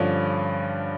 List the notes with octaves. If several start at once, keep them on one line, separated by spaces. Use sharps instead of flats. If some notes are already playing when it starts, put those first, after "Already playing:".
Already playing: G2 D3 F3 C#4